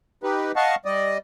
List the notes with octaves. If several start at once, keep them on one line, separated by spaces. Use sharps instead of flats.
D#4 G4 B4
D#5 F5 F#5 A5 C#6
G3 D5 D#5